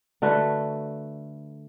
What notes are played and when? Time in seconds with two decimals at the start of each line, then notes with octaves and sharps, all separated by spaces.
0.22 D3 A3 F#4 B4